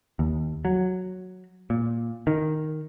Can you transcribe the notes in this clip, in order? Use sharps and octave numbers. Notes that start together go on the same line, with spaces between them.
D#2
F#3
A#2
D#3